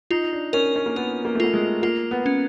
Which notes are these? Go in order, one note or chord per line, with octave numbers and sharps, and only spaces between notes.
D#4 F4
D4
C#4 A#4
C#4
A#3
B3 A#4
A#3
A3
A#3 F4
G#3
A#3 F4
B3
C#4